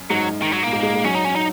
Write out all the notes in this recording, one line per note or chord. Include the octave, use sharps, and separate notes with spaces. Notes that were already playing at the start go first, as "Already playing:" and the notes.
Already playing: F#2
G#2 F#3
D#3
F#3
A#2 A#3
G#2
G#3
G#3
F#3 C#4
D#4
C#4
D#4